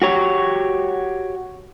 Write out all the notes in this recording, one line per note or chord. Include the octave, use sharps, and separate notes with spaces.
F#4 G4 C#5